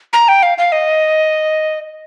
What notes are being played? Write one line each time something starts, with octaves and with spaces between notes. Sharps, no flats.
A#5
G5
F5
F5
D#5